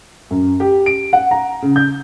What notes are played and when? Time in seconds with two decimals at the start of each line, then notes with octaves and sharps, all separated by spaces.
0.31 F#2
0.60 G4
0.86 D7
1.13 F#5
1.31 A#5
1.62 C#3
1.76 G6